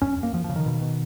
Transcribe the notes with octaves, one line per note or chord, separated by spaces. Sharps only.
F#2 C#4
F#2
A#3
F#2 F3
F3
C#3
D#3
B2
B2